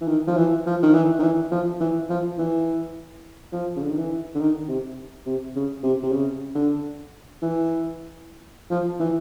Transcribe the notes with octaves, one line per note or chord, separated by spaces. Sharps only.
E3
D#3
F3
E3
F3
D#3
E3
D#3
E3
F3
E3
F3
E3
F3
C#3
D3
D#3
E3
D3
D#3
C3
C3
C#3
C3
C3
C#3
D3
E3
F3
E3